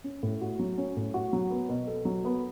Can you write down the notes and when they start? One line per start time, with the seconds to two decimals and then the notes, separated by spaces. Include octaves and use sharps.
0.04 C#4
0.23 A2
0.41 F#4
0.59 F#3
0.78 C#4
0.97 A2
1.14 F#4
1.33 F#3
1.50 B3
1.69 B2
1.87 A4
2.05 F#3
2.25 B3